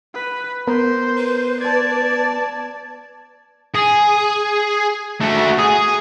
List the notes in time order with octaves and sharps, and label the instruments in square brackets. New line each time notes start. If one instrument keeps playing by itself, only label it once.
[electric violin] B4
[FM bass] B3 [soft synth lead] A#4 [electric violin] C5
[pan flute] B4
[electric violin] D5 A5 [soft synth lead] G#6
[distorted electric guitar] G#4
A3 F#4
G#4